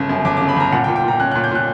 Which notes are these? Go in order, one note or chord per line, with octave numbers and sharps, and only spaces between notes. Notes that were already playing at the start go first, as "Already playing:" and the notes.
Already playing: G1 C#3
F#2
G1 D6
C#3 D6
B5
G1 A#5
A#2 F#5
G5
A#2
G5
A#2 A#5
C#4 F#6
A#2 F#6
G6
A#2 F#6